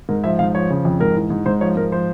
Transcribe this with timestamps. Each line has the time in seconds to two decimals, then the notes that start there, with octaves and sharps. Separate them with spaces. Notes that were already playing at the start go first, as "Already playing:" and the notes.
0.09 G#2 A#4
0.24 F3 E5
0.39 G#2 F5
0.54 F3 C#5
0.70 C#3
0.85 F2
1.00 G#2 A#4
1.16 E3
1.30 G#2
1.46 G#2 C5
1.61 F3 C#5
1.76 G#2 A#4
1.92 F3 C5